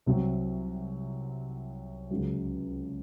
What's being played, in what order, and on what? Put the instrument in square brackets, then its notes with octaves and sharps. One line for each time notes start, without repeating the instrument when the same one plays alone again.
[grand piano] C2 C3 F#3 C4
C#2 C#3 F#3